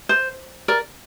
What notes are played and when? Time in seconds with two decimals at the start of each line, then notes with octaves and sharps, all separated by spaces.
0.09 C5
0.68 A#4 D5